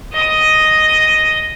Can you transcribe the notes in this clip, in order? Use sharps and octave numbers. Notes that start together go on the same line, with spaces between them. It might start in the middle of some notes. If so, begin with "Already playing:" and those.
D#5 D#6